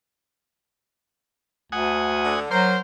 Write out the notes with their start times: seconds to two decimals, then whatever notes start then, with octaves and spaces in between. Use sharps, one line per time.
1.72 D2 F#5 G#5 D#6
2.25 D3
2.51 F#3 A#3 A#4 C5